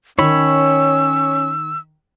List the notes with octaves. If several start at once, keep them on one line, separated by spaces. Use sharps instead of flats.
D#3 C#4 C#5 B5 E6